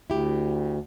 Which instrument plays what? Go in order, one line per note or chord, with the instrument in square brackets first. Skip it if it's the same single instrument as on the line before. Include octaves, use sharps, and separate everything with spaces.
[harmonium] D2 [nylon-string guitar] E4 G4